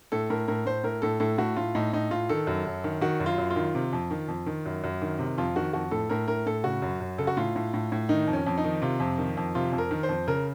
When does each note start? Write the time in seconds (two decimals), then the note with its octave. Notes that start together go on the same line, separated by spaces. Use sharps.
0.12 A2 A4
0.30 A2 A#4
0.48 A2 A#4
0.66 A2 C5
0.84 A2 A#4
1.02 A2 A4
1.20 A2 A4
1.38 A2 F#4
1.56 A2 F4
1.75 A2 D#4
1.93 A2 D#4
2.11 A2 F4
2.29 D#3 A4
2.47 F#2
2.65 F#2
2.84 D#3
3.01 D#3 F#4
3.20 F#2
3.26 F4
3.38 F#2
3.50 F4
3.56 D#3
3.75 C3
3.93 F2
4.11 D#3
4.28 F2
4.46 D#3
4.66 F#2
4.84 F#2
5.02 D#3
5.19 C3
5.38 F2 F4
5.56 D#3 F#4
5.73 F2 F#4
5.91 A2 A4
6.09 A2 A#4
6.28 A2 A#4
6.46 A2 A4
6.64 C#3 F#4
6.82 F#2
7.01 F#2
7.18 C#3 A4
7.27 F#4
7.37 A2 F4
7.55 A2
7.74 A2
7.92 A2
8.09 D#3 D#4
8.27 F2
8.33 C#4
8.46 F2
8.58 D#4
8.64 D#3
8.82 C3 F4
9.00 F2
9.18 D#3
9.37 F2
9.55 C3 F4
9.72 F2
9.78 A#4
9.91 D#3
10.03 C5
10.09 F2
10.28 C#3 A#4